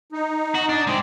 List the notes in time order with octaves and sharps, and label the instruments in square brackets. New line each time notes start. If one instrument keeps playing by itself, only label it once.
[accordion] D#4
[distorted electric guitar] F#4
D4
[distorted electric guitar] G#3 D5 [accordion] C4